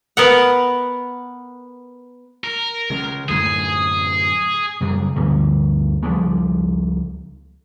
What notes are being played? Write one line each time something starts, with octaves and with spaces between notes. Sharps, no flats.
B3 A#4 F#5
A#4
C#3 G#3
F#2 A2 D3 G#4
F#2 C#3 G3
D2 G2 D3
C#2 F3 G3 G#3